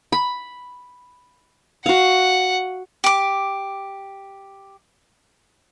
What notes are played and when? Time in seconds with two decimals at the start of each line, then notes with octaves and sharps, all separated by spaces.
0.12 B5
1.86 F#4 F5 F#5
3.04 G4 D6